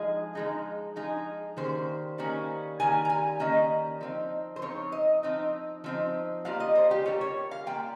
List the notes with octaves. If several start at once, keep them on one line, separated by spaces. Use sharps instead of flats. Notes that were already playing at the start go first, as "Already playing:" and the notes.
Already playing: F3 G#3 D#4 G#4
F3 G#3 D#4
F3 G#3 D#4 G#4
D#3 G3 A#3 C#4 C5
D#3 G3 A#3 C#4
D#3 G3 A#3 G#5
A#5
G#5
D#3 G3 A#3 C#4 D#5
F3 C4 D#4
C5
F3 C4 D#4 C#5
D#5
F3 C4 D#4
F3 C4 D#4
G3 A#3 F4 F5
D#5
C5
G4
G3 A#3 F4 C#5
C#5
F5
G3 A#3 F4 G5